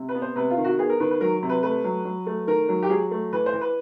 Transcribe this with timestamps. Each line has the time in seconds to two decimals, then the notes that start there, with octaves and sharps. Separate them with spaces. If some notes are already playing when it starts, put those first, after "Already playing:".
Already playing: C3
0.09 B4
0.15 B3
0.22 C5
0.36 C3 B4
0.50 F4
0.58 D#3
0.64 F#4
0.78 B3 G#4
0.90 A#4
1.00 D#3 B4
1.11 B4
1.21 F#3 A#4
1.43 C3
1.49 B4
1.63 A3 B4
1.84 F#3
2.05 F#3
2.27 A3
2.47 D#3 A#4
2.69 F#3
2.83 G4
2.90 F#3 G#4
3.11 A3
3.32 E3 B4
3.46 C5
3.53 E3
3.61 B4